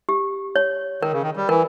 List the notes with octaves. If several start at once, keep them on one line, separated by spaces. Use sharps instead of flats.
G4
C#5
D#3 A#4
C#3
D#3
G3
E3 A#4